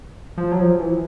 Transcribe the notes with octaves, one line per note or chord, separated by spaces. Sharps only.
F3
F#3
F3
E3